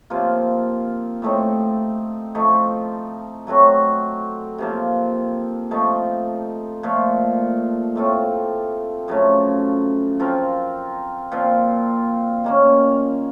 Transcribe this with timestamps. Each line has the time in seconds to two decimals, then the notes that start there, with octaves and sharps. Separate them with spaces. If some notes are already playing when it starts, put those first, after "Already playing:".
0.10 C3 F3 A#3 F4
1.22 A2 A3 C4 D#4
2.35 F3 A3 D#4
3.47 F#3 A3 C4 F#4
4.58 C3 F3 A#3
5.71 F3 A3 D#4
6.83 A#2 F3 A3
7.95 A2 A3 C4 F4
9.08 F#2 C#3 F3 A3
10.20 F3 C4 F4 A#4
11.32 A#2 F3 C4 F4
12.44 D#3 A#3 C#4